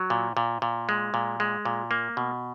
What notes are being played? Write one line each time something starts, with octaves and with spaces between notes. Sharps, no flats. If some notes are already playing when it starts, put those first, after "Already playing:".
Already playing: F#3
A#2
A#2
A#2
G#3
A#2
G#3
A#2
A#3
B2